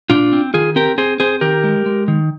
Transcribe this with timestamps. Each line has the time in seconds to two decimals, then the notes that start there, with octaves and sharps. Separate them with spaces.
0.10 A#2 D4 F4
0.32 C4
0.54 D#3 F4 G#4
0.76 C4 G4 A#4
0.98 C4 G#4 C5
1.20 C4 G#4 C5
1.41 D#3 G4 A#4
1.64 G#3
1.86 G#3
2.08 D#3